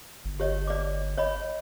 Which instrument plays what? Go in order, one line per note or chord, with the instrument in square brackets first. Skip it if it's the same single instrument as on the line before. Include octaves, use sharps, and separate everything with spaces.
[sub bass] G1
[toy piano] G4 C#5 D#5
D5 D6
C#5 D#5 B5